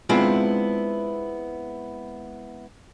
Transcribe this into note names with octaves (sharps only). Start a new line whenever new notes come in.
G#3 B3 C4 D4 E4 F4